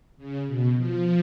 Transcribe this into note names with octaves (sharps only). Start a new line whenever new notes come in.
C#3
B2
F3